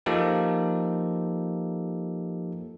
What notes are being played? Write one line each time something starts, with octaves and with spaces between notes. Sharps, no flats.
F3 A#3 D#4 G4 A4